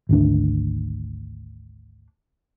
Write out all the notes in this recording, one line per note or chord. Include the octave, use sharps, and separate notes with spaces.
G#1 D2 D4